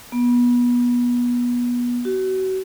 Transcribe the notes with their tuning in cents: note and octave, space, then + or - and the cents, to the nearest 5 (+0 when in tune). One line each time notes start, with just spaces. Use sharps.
B3 -25
F#4 +35